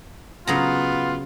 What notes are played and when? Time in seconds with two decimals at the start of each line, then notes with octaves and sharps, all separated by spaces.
0.47 C#3 F#3 B3 F4 A#5